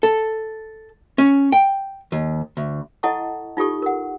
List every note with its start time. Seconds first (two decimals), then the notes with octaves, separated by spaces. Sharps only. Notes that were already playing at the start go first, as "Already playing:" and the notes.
0.03 A4
1.18 C#4
1.52 G5
2.12 D#2
2.57 D2
3.03 E4 A4 D#5 F#5 A5 C#6
3.57 D#4 F4 G4 A4 C#6
3.82 A#4 F#5